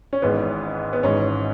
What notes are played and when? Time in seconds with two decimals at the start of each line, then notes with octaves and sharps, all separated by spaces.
0.13 C#4
0.22 G#1 G#2 E3 B3
0.93 B3
1.03 G#1 G#2 E3 C#4